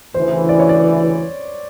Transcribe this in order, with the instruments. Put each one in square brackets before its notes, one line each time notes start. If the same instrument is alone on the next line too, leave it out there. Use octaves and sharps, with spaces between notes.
[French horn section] D2 C#3 E3 [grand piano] C5
[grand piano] D5
C#5
D5